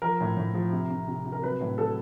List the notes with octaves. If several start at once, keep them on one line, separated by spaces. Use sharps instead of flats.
F3 A#4
A2
A2
F3
C3
C3
C3
C3
A#4
F#3 B4
A2
F#3 A4